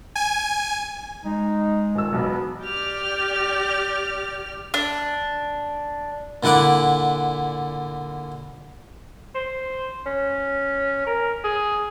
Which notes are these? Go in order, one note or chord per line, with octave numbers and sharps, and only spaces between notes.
G#5
G#3 D#4
D#1 D#3 E6
E1 B1 B3
G4 D5 F6
D4
A#2 D3 E4 F#5 D6
C5
C#4
A#4
G#4